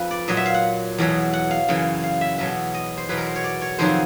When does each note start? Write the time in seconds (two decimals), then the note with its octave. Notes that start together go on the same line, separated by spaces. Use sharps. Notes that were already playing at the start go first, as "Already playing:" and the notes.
Already playing: F2 F3 B4
0.11 D5
0.28 A#2 F#3 D#5
0.37 E5
0.46 F5
0.54 F#5
0.98 E2 B2 F#3
1.33 F#5
1.51 F5
1.68 F#2 C#3 E3
2.03 F5
2.21 E5
2.38 E2 B2 F#3 E5
2.74 D#5
2.97 C5
3.09 E2 B2 F#3 B4
3.17 A#4
3.27 C5
3.35 C#5
3.44 D5
3.61 C#5
3.79 F2 C3 D#3 F#3 C5